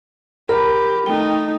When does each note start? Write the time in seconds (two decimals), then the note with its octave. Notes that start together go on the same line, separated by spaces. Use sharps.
0.49 G4 A#4 B5
1.06 A3 D#4 G5